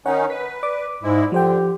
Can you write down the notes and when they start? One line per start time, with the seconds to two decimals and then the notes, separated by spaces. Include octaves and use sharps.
0.06 D#3 C#4 D#4 C#5 F#5
0.30 B4 B6
0.63 D5 D6
1.03 G#2 G#3 E4
1.32 D3 F3 G4 C5 G5